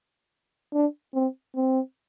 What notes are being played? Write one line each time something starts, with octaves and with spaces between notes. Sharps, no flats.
D4
C4
C4